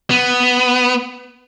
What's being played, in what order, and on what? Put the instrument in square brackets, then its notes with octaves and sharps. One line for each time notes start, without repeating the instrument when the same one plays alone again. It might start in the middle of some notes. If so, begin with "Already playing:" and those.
[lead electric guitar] B3